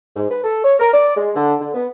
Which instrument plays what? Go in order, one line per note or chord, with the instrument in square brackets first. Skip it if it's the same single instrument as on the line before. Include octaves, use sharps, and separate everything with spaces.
[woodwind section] G#2
B4
A4
C#5
A#4
D5
G#3
D3
D3
B3